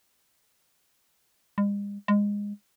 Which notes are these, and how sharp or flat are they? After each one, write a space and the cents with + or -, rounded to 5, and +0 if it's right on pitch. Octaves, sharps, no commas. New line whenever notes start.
G#3 -45
G#3 -20